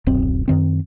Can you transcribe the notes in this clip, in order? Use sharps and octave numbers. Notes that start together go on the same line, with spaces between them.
D1 B1 F#2 C4
F#2 D#3 C4